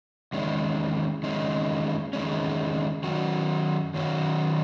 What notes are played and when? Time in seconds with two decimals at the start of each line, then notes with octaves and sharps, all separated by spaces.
0.32 E2 D#3 G#3 C#4
1.23 E2 D#3 G#3 C#4
2.13 E2 D#3 G#3 C#4
3.03 F#2 D#3 F#3 C#4 F#4
3.94 F#2 D#3 F#3 C#4 F#4